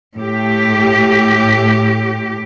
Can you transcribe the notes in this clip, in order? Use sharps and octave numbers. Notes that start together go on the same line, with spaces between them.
A2 G4